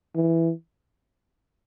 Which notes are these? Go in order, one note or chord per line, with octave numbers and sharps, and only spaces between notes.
E3